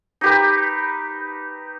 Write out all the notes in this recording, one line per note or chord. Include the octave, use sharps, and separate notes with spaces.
D#4 G4 B4